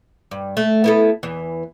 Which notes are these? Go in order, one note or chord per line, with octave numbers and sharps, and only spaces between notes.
G2
A3
B3 E4 A4
E2 E3